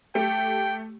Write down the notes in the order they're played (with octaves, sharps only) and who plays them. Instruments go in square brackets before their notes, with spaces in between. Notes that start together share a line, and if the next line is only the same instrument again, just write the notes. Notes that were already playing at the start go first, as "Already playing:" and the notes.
[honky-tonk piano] A3 G4 [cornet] G5